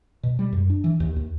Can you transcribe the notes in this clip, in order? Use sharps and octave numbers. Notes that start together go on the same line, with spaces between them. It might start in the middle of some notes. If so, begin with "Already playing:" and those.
B2
G3
F#2
D4
E3
D#2
D#2